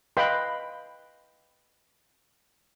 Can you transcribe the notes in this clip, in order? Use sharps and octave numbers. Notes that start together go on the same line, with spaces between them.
B4 D#5 F5 G5 B5 C6